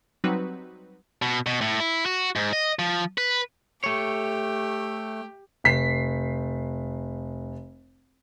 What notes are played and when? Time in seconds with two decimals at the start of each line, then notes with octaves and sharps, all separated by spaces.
0.24 F#3 G3 C4 D#4 F#4 B4
1.22 B2
1.46 B2
1.61 A2
1.80 E4
2.06 F#4
2.36 G#2
2.53 D#5
2.79 F3
3.18 B4
3.84 A3 G4 C#5
5.64 F1 B6 C7